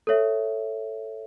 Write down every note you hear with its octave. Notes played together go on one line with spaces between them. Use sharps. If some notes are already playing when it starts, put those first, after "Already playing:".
A4 C#5 E5